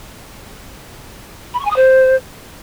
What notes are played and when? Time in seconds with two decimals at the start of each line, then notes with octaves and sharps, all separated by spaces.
1.54 B5
1.59 C#6
1.65 G#5
1.70 D#6
1.76 C5